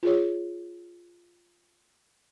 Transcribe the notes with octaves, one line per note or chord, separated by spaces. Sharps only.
F4 G#4 C#5